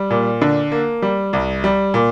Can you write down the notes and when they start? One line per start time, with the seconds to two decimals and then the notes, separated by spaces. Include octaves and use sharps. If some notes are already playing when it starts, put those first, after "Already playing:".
Already playing: G3
0.10 A#2
0.42 D3
0.72 A#3
1.02 G3
1.33 C2
1.64 G3
1.94 A#2